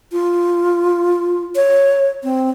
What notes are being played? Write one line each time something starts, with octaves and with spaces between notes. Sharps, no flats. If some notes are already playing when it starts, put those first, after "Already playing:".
F4
C#5
C4